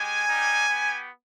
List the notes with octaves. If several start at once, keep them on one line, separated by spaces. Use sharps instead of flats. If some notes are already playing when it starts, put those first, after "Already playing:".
Already playing: G#3 G4 G#5
G3 A#3 D#4 G4
B3 G4